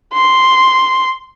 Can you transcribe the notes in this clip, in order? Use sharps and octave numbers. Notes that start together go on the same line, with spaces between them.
C6